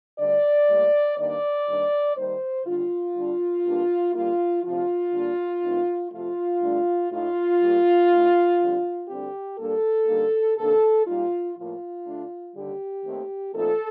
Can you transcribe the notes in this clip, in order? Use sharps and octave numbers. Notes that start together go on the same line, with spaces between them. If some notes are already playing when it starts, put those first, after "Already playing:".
D2 D3 G3 D5
A2 G3 A#3
G2 D#3 A#3 D4 D5
D#2 D#3 G3 D4
D#2 D#3 G3 A#3 C5
D#2 D3 G3 D4 F4
D3 G3 D4
G2 D3 G3 A#3 D4
D3 G3 A#3 F4
D2 C3 F3 F4
D3 G3 A#3 D4
G2 D#3 A3 C4 D#4
C3 F3 A3 F4
G2 D3 A3 D4
A2 A3 D#4 F4
A#2 G3 A#3
A2 A3 D#4
F2 D3 G3 C4
D2 D3 G3 C4 G4
A#2 G3 A#3 D4 A4
D3 G3 A#3 D#4
C3 D#3 A#3 D4 A4
A#2 G3 A#3 D#4 F4
A2 F3 A#3 F4
D3 A3 D4
D#2 D3 G3 G4
D#2 D#3 A3 C4
A#2 F3 A3 C4 D#4 A4